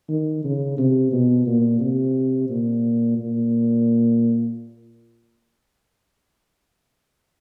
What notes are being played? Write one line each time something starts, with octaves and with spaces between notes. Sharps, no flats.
D#3
C#3
C3
B2
A#2
C3
A#2
A#2